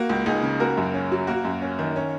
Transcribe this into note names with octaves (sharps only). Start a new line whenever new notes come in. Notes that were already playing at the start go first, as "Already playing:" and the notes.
Already playing: A#3 F#4
C#2
C#2 D#4 G#4
C#3
A#3 F#4 A#4
F#2
C#4
F#3
A#3 F#4 A#4
F#2
C#4
D#3
C#4